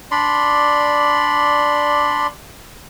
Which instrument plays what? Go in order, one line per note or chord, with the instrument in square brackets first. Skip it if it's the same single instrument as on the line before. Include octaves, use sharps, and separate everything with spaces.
[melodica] D4 D5 B5 C6